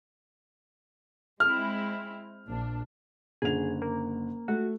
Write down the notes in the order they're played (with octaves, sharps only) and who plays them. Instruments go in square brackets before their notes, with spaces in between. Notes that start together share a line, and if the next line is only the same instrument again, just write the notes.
[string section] G#3 C4 E4 [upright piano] F6
[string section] A#1 D4
[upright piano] F#1 D3 F7 [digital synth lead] G#4
[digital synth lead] A#3
[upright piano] A3 [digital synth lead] F#4